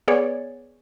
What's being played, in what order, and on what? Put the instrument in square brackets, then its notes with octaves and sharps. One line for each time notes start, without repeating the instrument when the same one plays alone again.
[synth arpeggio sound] B3 G#4 C#5 D5